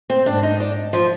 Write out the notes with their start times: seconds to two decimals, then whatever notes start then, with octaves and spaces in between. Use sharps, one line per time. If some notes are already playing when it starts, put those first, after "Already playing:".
0.10 C4
0.26 G#2 D4
0.43 D#4
0.60 D4
0.93 F3